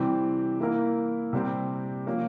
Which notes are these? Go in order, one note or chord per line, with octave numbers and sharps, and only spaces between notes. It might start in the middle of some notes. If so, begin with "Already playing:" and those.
Already playing: C3 E3 G3 C4 G4
E3 A#3 E4 A#4
C3 G3 C4
F3 A#3 C#4